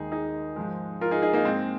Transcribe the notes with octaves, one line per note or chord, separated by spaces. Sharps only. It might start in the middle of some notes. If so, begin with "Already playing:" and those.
Already playing: D#2 D#3 G#3 D#4 G#4
D#4 G#4
G#2 F3 G#3
F4 A#4
D#4 G#4
D#4 G#4
A#3 D#4
G#2 G#3 C4